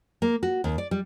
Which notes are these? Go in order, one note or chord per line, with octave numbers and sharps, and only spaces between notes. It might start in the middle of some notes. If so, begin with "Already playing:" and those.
A#3
F#4
D#2
D5
G3